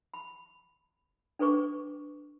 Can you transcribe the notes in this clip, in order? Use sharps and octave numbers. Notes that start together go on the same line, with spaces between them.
B5
D4 A4 B4 C#6 D6